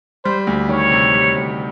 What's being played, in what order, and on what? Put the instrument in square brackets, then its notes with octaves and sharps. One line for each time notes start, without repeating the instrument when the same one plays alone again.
[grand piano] G3 [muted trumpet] C5
[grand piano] D2
[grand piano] D#3 [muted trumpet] C#5
[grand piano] C3
G3
D2